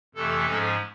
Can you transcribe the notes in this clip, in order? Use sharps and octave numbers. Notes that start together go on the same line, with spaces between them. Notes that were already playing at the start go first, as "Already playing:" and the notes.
F2 C3 E3 A3 A4
G#2 F3 G#3 C#4